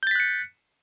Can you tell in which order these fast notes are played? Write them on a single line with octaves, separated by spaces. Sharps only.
G6 A6 B6 F#6 C#7